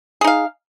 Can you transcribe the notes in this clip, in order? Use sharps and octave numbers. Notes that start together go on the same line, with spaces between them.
D#4 G#4 F5